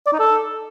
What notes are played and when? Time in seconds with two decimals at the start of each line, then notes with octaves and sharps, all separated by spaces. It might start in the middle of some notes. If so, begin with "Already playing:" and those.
0.06 D5
0.13 D#4
0.19 A4